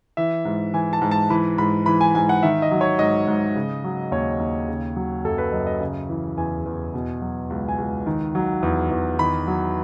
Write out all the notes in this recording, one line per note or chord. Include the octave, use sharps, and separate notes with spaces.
E3 E5
G#2
E3 G#5
A5
G#2
A5
E3 B5
G#2 B5
E3 B5
G#5
G#2 G#5
F#5
D#3 E5
D#5
F#3
C#5
G#2 D#5
G#2
C#3
F#3
D#2 C#5
D#2
C#3
F#3
F#2 A4
B4
F#2 D#5
D#5
C#3
E3
E2 G#5
E2
B2
F#3
C#2
G#5
C#2
D#3
F#3
E2
E2
D#3 B5
F#3